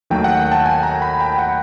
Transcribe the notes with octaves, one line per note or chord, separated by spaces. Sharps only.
D#2 D#3 F#3 A3 G5
F#5
G5
A5
G#5
A#5
B5
G5
F#5